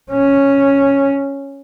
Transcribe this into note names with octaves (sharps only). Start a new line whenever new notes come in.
C#4